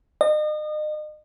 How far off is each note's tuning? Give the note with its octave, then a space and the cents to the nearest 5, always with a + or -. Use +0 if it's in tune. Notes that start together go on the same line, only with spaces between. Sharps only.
D#5 -35